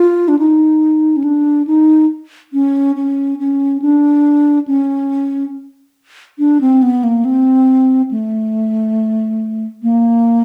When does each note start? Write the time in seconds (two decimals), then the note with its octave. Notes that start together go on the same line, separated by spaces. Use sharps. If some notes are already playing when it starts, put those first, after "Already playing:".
Already playing: F4
0.28 D4
0.39 D#4
1.17 C#4
1.24 D4
1.67 D#4
2.53 C#4
2.96 C#4
3.39 C#4
3.82 D4
4.68 C#4
6.39 D4
6.61 C4
6.82 B3
7.04 A#3
7.25 C4
8.11 A3
9.83 A#3